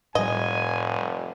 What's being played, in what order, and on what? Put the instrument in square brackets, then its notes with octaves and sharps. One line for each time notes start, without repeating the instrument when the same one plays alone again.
[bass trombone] F1 [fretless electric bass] A2 G3 [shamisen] D#5 [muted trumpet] G#5